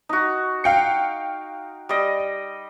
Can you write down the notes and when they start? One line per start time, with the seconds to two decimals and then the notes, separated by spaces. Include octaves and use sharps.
0.09 D#4 F#4
0.64 F5 G5 C#7
1.89 G3 D#5